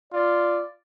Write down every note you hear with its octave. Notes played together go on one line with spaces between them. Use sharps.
F4 D5